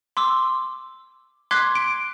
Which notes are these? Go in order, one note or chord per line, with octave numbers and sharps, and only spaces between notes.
C6 D6 E6
C6 D6 F#6 G#6 B6 C7
D7